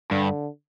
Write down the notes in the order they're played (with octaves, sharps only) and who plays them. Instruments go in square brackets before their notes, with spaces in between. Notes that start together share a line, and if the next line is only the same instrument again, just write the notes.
[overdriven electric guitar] G2 [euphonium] D3